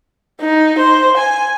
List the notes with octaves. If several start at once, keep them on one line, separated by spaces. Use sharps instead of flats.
D#4
C5
G#5